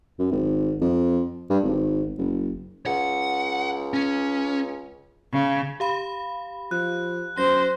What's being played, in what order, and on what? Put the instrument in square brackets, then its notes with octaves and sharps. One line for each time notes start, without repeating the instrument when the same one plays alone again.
[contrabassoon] F#2
G#1
F2
G2
G#1
F#1
[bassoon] C#2 [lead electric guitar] F#5
[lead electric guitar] C#4
[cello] C#3
[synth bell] G4 F5 B5
[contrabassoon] F3 [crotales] F#6
[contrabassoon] F#2 [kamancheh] C5 [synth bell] A#6